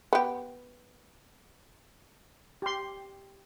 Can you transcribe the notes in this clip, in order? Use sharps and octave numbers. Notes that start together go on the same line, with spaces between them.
B3 G4
G4 C6